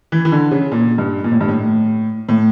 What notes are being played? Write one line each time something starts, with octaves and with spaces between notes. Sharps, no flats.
E3
E3
D3
C#3
A#2
G2
A#2
A2
G2
A2
A2